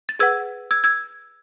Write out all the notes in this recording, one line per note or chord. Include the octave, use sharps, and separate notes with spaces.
A6
G#4 B4 F#5 E6 G#6
E6 G#6
E6 G#6